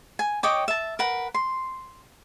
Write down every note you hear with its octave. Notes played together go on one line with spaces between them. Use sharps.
G#5
C#5 D#5 G5 D6
E5 A5
A#4 B4 F#5
C6